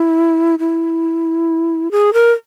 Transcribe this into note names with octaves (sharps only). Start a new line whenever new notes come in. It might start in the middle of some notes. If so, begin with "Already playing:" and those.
Already playing: E4
E4
G#4
A#4